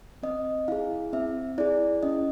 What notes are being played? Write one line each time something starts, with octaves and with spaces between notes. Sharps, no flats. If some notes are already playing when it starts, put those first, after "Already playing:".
C4 D#5
E4 G#4 F5
C4 E5
E4 G#4 D5
C#4 D#5